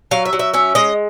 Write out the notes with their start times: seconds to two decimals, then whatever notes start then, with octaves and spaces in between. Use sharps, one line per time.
0.11 F#3 F5
0.25 E5
0.33 F#3
0.39 E5
0.54 C#4 E5
0.75 G#3 D#5